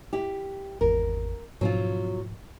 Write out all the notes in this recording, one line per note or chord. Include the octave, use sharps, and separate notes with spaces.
E4 G4
G#1 E2 A#4
G#2 B2 F3 F#3 C4 F4